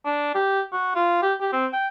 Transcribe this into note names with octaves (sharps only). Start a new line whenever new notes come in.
D4
G4
F#4
F4
G4
G4
C4
G5